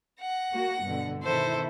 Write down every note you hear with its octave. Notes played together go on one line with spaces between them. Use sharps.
F#5 A#6
A#3 F#4
G2 B2 D3
B2 D#3 E4 A4 C5